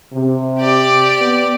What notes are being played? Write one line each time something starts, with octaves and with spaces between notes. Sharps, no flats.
C3
G4 D5
B3